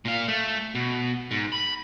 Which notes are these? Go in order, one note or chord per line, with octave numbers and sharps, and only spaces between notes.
A#2 F5
A3
B2
G#2
B5